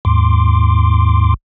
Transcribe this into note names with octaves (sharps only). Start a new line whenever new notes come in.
D#2 G#2 C6 D6